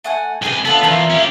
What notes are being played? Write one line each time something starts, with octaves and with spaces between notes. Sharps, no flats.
A3 F#5 G#5
C2 G4 G#4 B4 G#5
B3 D4 F4 A4
E2 F4 A#4 E5
C#4 G4